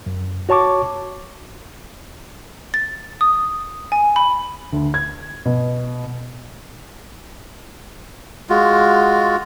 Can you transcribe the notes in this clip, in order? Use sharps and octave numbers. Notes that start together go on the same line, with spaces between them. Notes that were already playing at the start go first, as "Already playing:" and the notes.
F#2
F#4 C#5 A5 C#6 D6
A6
D#6
G#5
B5
D2
G#6
B2
G#3 F4 F#4